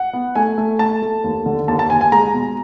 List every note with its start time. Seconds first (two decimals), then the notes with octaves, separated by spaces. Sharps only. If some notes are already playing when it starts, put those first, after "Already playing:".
Already playing: F#5
0.13 B3
0.36 A3 G#5
0.58 A3
0.79 A3 A5
1.02 A3
1.24 D#2
1.46 D3
1.68 D#2 A5
1.79 A5
1.90 D#2 G#5
2.01 G#5
2.12 G#3 A#5
2.34 B2